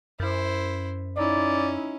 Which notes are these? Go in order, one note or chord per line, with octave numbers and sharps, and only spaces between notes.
F#2 E4 C5
C#4 D#4 E4 D5